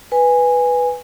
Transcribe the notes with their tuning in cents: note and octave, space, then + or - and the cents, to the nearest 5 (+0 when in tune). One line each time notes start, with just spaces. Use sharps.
B4 +0 G#5 -10